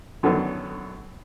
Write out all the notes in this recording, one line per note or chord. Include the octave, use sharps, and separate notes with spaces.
F#2 D3 D#3 F#3 B3